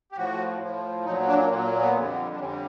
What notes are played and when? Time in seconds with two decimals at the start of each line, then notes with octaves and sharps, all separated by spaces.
0.12 G4
0.16 A2 F3 F#4
0.60 A2 F3
1.05 A#2 F#3 D#4
1.27 D4
1.50 A#2 F#3 A#3
1.65 A#3
1.80 B3
1.94 F2 D3 G3
2.35 D4
2.40 F2 D3 G3 C#4